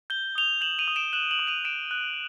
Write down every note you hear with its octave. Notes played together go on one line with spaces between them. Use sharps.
G6 G7
D#6 F7 G7
G6 E7 F#7
D#7 F7
D#6
D7 E7
F#6 E7 F#7
E7 F#7
D#6
D#7 F7
D#6 D7 E7
F#6